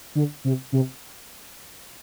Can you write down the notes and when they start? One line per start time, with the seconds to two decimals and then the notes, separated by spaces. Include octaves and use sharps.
0.15 D3
0.44 C3
0.72 C3